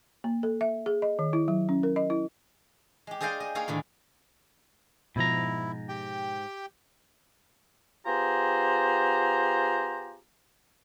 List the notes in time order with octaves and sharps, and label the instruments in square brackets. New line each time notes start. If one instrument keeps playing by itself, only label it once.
[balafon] A#3
A4
E5
G#4
D#5
D#3
E4
F#3
C#4
A#4
D#5
E4
[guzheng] G#3 G4
G#4 C5 D5 D#5 F5 G5
D#5
A#3 D#4 G#4 C#5 F5
A2 D3 D#3
[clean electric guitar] G#2 A#5 [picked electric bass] B2 F3 [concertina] E4
[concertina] G4 G5
[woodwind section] B3 F4 G4 G#4 C5 A#5